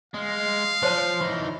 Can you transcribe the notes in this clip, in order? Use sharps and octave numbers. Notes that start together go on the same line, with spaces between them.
G#3 F5
F3 C5 C#5 A5
E3 D#4